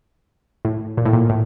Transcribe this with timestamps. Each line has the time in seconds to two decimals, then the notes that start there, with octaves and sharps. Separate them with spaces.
0.65 A2
0.97 A#2
1.05 A2
1.13 A#2
1.30 A2